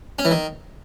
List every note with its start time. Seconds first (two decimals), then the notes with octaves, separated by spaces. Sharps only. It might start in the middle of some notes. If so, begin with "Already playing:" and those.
0.19 C#4
0.25 E3
0.31 D#3